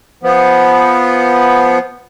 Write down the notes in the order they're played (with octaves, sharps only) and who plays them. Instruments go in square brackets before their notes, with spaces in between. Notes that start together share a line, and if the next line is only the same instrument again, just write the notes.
[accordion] F3 B3